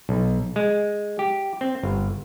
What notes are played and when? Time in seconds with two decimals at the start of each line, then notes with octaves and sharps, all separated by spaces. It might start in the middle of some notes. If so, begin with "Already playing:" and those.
0.09 B1
0.56 G#3
1.19 G4
1.61 C4
1.83 G1